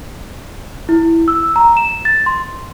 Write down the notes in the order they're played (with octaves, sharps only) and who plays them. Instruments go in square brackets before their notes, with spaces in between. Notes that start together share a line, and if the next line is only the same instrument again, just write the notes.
[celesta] E4
E6
A#5
E7
A6
C6